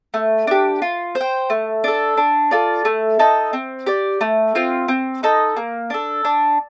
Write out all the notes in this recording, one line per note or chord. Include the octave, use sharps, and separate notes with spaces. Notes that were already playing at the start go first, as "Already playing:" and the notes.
A3
D4 G4
F4
C5
G5
A3
D4 A4
D4
F4 A4 D5
A3
D#4 A4 D#5
C4
G4 D5
A3
C4 F4
C4
D#4 A4 D#5
A#3
D4 A4
D4